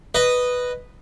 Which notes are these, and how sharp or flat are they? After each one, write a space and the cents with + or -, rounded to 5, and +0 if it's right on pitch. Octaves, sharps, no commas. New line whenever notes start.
B4 +0 D#5 -10